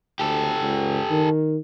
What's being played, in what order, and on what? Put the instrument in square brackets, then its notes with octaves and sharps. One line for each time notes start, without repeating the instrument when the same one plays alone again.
[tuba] D2 [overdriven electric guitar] G4 A4
[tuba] C#2
D#3